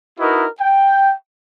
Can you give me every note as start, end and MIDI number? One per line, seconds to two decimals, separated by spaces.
0.19 0.47 63
0.19 0.47 64
0.19 0.47 66
0.19 0.47 70
0.19 0.47 71
0.19 0.47 75
0.60 1.13 79